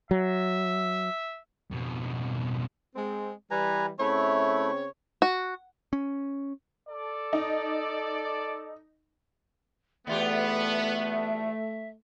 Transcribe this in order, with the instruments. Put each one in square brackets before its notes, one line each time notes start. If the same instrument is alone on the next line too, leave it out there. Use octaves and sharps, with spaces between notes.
[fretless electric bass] F#3 [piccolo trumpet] E5
[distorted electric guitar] F2 B2
[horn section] G#3 C4
[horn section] E3 G3 [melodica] B4 G#5 A#5
[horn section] C#3 C4 C#5 [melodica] A3 E4
[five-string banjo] F#4
[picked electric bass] C#4
[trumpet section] A4 D5
[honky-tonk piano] D#4
[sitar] E2 F4 G4 [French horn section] A3 [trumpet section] B3 [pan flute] E5